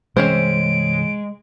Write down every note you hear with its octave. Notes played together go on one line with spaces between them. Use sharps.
C3 E3 G#3 C4 C#4 C5 D7